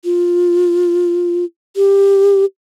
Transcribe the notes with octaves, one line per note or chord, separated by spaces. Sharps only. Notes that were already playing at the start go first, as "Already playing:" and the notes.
F4
G4